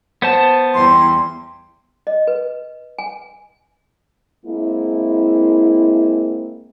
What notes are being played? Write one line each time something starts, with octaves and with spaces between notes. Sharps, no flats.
B3 C5 A5
E2 G3 C6
D#5
B4
G#5
G#3 A#3 C4 E4